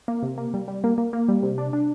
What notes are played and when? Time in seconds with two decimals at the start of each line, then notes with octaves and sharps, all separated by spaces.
0.08 A#3
0.23 C3
0.38 A#3
0.54 G3
0.68 G3
0.84 A#3
0.98 A#3
1.13 A#3
1.28 G3
1.43 C3
1.58 D4
1.73 D4